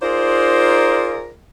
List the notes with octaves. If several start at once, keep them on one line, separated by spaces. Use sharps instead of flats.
D#4 F4 G#4 A#4 C5 D5